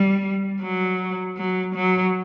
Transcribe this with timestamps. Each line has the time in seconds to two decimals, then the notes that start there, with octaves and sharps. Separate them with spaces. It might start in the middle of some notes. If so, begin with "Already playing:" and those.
Already playing: G3
0.61 F#3
1.38 F#3
1.75 F#3